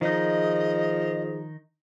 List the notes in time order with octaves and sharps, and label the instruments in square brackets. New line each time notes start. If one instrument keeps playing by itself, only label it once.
[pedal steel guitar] D#3 D#4 [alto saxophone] F3 [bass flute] G#4 [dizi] D#5